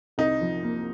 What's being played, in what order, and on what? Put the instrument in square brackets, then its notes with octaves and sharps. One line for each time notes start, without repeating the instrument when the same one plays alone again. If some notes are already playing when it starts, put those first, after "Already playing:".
[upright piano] C2 [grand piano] D#4
[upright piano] F3
A#3